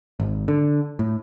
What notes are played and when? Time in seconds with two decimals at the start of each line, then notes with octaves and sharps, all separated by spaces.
0.20 G#1
0.48 D3
0.99 A2